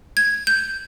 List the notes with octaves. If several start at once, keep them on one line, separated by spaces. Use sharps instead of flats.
G#6
G6